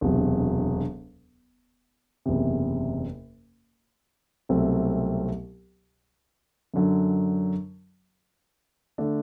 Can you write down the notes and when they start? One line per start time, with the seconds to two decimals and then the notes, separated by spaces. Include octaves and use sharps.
0.01 E1 D2 C3 F#3
2.26 F#1 E2 C3
4.49 C2 B2 F#3 A3 C4
6.74 F#2 D3 F#3
8.98 D3 A3 D4